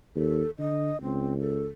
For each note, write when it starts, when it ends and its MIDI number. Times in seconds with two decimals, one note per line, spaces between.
0.16 0.42 39
0.16 0.50 69
0.59 0.92 50
0.59 1.02 75
1.02 1.70 37
1.02 1.38 60
1.40 1.66 69